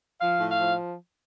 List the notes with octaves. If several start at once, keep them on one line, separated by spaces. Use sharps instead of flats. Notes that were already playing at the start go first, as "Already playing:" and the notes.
F3 F5
A2
F5
F3